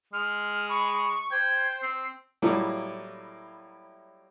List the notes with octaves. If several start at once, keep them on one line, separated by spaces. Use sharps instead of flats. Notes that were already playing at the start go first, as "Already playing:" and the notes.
G#3 F6
B5 C#6
C5 G5 G#6
C4 C7
A2 F#3 G3 A#3 E4 F4